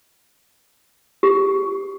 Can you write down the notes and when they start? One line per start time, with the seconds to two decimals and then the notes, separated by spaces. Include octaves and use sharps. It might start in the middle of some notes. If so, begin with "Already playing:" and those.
1.23 G4